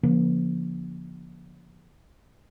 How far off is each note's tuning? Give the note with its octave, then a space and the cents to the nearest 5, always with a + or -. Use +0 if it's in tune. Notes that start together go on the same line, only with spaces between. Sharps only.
D3 -35 F3 +0 A#3 +35